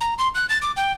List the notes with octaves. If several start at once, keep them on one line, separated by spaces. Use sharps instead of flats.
A#5
C6
F#6
A6
D6
G5